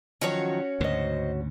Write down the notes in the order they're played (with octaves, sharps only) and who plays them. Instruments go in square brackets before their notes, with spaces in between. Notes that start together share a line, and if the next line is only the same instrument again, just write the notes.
[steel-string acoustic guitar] D#3 F3 F#3 [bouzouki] C#4 F#4 C#5
[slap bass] D2 G#2 C#3 [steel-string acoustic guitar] C5 D#5